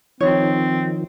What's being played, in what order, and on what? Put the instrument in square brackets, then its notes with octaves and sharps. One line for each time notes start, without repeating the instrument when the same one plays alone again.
[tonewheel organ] D#3 F3 [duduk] C4 [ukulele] D#4 C#5